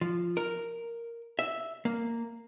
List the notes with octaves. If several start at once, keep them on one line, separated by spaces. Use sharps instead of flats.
F3
A#4
E5
A#3